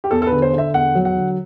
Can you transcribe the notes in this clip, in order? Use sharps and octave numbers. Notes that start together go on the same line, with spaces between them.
G4
E2 A4
A4
B4
D3
C5
D3 E5
E2 F#5
F#3
F#5
D3